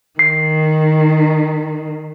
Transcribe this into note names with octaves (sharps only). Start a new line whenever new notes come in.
D#3 C7